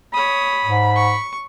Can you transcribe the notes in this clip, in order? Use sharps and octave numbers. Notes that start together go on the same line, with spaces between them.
C#5 B5 D#6
G#2
C#6